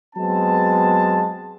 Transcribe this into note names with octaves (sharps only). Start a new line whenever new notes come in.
F#3 G#3 B3 C4 A5